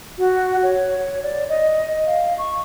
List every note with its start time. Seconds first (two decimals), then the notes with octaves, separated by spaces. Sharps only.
0.18 F#4
0.63 C#5
1.23 D5
1.49 D#5
2.07 F5
2.38 C#6